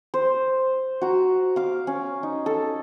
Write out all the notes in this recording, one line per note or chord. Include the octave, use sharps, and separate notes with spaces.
C5
F#4 A#5
F5 D6
C#4
D#4
A4